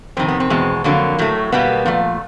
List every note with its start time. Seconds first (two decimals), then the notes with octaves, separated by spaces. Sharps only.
0.17 F2 C3 D#3 C4
0.28 B3
0.40 C4
0.50 E2 B2 G#3
0.84 F2 D3 F#3 A#3
1.19 A2 F#3 A3
1.52 B2 G3 A#3 B3
1.86 A#2 F3 A3